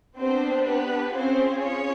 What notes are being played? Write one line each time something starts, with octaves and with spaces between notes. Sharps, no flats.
B3 C4 D4 G4 C5
B3 B4
C4 C#4 F4 G#4 C5
C#4 C#5